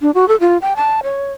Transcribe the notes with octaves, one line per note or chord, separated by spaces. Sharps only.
D4
F#4
A4
F4
G5
A5
C#5